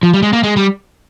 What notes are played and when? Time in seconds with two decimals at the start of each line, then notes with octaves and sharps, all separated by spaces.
0.03 F3
0.14 G3
0.23 G#3
0.33 A#3
0.44 G#3
0.57 G3